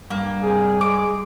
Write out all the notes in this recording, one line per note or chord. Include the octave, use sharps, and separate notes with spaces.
G2 A#3
C3 G3 G#4
G#3 G#4 D6